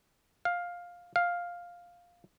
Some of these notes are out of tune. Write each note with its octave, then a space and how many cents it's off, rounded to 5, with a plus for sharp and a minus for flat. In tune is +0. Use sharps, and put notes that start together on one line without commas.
F5 +10
F5 +5